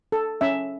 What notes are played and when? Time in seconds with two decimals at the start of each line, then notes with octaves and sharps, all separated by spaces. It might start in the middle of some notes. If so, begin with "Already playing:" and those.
0.12 A4
0.41 C#4 E5